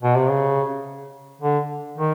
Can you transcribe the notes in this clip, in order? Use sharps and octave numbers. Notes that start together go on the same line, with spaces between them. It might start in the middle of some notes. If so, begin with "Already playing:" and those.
B2
C3
C#3
D3
D#3